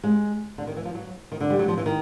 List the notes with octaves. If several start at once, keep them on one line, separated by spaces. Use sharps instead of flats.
G#3
D3
D#3
E3
F3
F#3
D#3
D3
G3
F#3
F3
E3
D#3